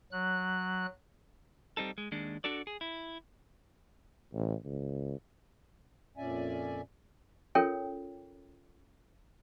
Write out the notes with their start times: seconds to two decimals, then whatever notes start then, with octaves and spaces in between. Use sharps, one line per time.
0.12 F#3 F#6
1.77 G3 C4 D#4 A4
1.98 G#3
2.12 D#2 G#3 D4
2.44 D4 F#4 A4 D5
2.67 G#4
2.81 E4
4.34 A1
4.65 C#2
6.17 F2 A#2 C#4 D5 E5 G#5
7.55 C#4 F4 A4 A#4 C#5 G5